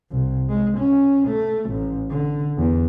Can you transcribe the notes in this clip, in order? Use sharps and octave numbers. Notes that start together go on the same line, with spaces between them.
C2
G#3
C#4
A3
A1
D3
E2